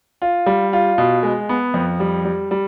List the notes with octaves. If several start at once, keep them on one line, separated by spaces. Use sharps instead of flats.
F4
G3
F4
B2
G#3
B3
F2
G3
G3
G3